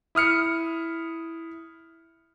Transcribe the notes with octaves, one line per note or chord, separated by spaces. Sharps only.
E4 D#6 F6 C#7